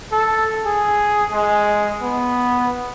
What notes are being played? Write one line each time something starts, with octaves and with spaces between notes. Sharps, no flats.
A4
G#4
G#3
B3